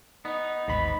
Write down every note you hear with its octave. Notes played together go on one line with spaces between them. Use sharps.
B3 D#4
A1 D#2 G#2 B5